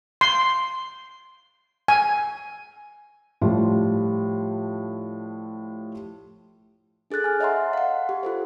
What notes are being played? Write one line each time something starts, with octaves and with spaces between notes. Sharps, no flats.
C6
G#5
A2 F3 G3 F4
D4 G#4 A4 F#6 A6
G#5 F6
C#5 D#5 E5 F#5 A#5 C6
F5 F#5
G4
F4 A4 C5